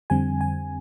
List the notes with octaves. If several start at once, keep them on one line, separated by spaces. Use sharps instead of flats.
F2 D3 G3 C4 G#5
G#5